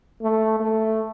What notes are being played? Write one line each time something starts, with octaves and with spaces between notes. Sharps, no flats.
A3
A3